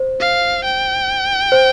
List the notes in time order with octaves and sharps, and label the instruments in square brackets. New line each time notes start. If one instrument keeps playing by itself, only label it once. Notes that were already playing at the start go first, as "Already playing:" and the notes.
Already playing: [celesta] C5
[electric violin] F5
G5
[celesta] C5